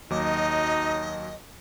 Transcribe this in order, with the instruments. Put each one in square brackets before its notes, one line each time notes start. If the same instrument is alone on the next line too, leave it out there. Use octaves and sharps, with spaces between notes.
[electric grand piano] D#2 F#3 D6 [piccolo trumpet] D#4 [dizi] D#5